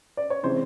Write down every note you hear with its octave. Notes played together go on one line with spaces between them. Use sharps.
D5
C#5
C3 E3 G#3 C4 C5